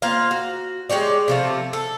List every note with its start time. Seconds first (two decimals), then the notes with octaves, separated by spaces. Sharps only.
0.02 A#3 C4 F4 F5
0.31 F#4
0.89 G#3 G4 C#5 D5
1.28 C3 F3 A3
1.73 A4